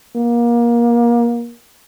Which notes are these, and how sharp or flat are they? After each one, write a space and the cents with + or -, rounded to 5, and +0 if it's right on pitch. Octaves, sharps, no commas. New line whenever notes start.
A#3 +25